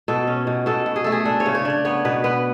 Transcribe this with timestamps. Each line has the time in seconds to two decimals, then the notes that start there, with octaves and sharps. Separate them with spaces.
0.08 B2 A4
0.27 C#4
0.47 B2
0.66 B2 A4
0.86 B2
0.96 G#4
1.04 A3 A4
1.12 G#4
1.25 D4 A4
1.40 C#5
1.46 C#3
1.55 C#5
1.65 D4 D5
1.85 B3 C#5
2.05 B2 B4
2.24 B3 B4